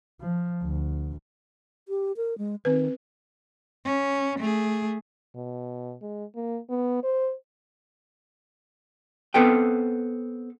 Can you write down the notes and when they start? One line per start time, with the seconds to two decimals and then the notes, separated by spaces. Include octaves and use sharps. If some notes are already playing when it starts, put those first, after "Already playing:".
0.21 F3
0.63 D2
1.88 G4
2.17 A#4
2.38 G#3
2.65 D#3 C4 B4
3.85 C#4
4.39 A3 G#4
5.35 B2
6.02 G#3
6.36 A#3
6.70 B3
7.04 C5
9.34 B3 C4 A4 B4 G5